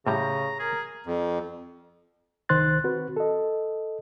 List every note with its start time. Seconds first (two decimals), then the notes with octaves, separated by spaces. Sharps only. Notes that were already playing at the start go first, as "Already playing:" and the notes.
0.07 A2 C#3 G3 A#5
0.60 G#4 A#4
1.06 F2
2.49 C2 D#3 C5 C6 F#6 A6
2.84 C4 F#4 B4
3.17 A4 D#5